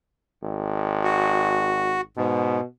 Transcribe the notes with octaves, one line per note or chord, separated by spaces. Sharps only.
G#1
F#4
G#2 B2